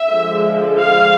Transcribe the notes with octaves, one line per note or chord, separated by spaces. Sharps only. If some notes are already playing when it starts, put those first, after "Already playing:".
Already playing: E5
D3 F3 G#3
F5